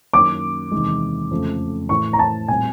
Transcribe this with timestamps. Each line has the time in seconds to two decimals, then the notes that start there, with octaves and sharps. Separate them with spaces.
0.13 F#2 D#3 F#3 A#3 C#4 D6
0.71 E2 C3 D#3 G#3
1.31 F2 C#3 F3 A3
1.89 A2 E3 A3 C#6
2.13 A#5
2.19 A5
2.48 A#2 G3 C4 G#5